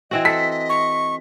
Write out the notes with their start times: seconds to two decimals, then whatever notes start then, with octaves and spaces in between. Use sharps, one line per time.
0.11 E3 C4 F#4 D#5
0.25 A4 B6
0.69 C#6